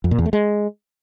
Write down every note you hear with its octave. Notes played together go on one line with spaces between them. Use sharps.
F2
A#2
E2
A3
G#3